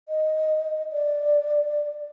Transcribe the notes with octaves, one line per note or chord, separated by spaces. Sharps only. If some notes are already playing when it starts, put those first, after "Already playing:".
D#5
D5